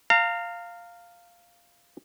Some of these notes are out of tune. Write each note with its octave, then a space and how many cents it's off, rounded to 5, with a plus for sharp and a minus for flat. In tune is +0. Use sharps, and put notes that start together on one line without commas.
F5 +0 A#5 -35